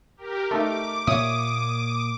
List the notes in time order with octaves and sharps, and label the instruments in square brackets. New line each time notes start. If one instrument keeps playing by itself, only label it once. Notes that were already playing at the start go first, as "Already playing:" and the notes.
[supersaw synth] G4 A#4
[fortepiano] A3 D#4 E5 [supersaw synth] D6
[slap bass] A#2 A#3 [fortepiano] C#5 E5 [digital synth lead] D#6